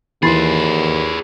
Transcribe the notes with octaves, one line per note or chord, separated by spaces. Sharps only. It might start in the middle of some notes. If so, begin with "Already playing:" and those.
D#2 E3 G#4 B4 B5 C6 A6 C7